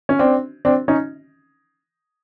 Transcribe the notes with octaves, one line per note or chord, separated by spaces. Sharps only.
C#4
C4 D4
C4 D4
C#4 D#4